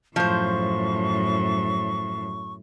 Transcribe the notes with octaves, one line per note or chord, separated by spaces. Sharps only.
F#2 A2 F3 C5 C#6